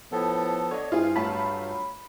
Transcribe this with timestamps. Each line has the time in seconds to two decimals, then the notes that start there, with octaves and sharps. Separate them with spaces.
0.12 A2 F3 B3 A4
0.71 D3 C#5 D#5
0.92 G2 C4 E4 F4 G#4
1.16 F#3 A3 F4 A5 B5